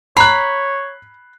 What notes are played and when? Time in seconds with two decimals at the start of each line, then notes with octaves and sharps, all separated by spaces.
0.17 C#5 A#5 B5 F#6 C7